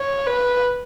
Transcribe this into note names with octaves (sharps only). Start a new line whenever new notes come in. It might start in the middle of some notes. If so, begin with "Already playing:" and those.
Already playing: C#5
B4